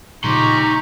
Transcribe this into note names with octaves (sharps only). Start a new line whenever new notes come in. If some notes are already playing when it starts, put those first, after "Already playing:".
A#2 C#3 F3 D#4 G4 A#5 C6 C#6